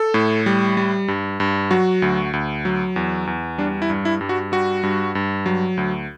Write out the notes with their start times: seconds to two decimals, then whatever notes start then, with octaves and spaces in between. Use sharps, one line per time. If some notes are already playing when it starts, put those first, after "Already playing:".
Already playing: A4
0.14 A2
0.46 G3
0.77 G3
1.08 G2
1.40 G2
1.71 F#3 F#4
2.02 D2
2.33 D2
2.65 F#3
2.96 E2
3.27 E2
3.58 G3 D4
3.82 E4
3.90 G2
4.05 E4
4.21 G2
4.29 F#4
4.52 G3 F#4
4.83 G2
5.15 G2
5.46 F#3
5.77 D2